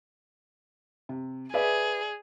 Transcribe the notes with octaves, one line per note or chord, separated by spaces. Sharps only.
C3
G#4 B4 D5 E5